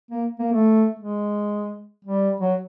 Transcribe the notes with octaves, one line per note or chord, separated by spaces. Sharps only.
A#3
A#3
A3
G#3
G3
F#3